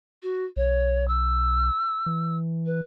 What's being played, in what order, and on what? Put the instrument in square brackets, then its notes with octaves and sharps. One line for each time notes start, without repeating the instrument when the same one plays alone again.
[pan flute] F#4
[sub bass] B1 [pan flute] C#5
[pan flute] E6
[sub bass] E3
[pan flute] B4